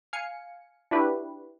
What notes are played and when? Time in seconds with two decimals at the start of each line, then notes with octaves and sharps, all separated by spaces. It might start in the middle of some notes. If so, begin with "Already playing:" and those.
0.13 F5 G#5 C#7
0.91 D4 E4 F#4 G4 B4